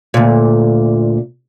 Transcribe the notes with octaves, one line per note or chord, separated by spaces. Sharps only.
D2 A#2